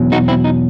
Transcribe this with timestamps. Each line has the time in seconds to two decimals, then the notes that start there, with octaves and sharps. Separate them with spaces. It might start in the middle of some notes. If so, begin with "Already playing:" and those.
Already playing: E2 B2 F#3
0.12 D#4 F#4
0.28 C4 E4
0.44 D#4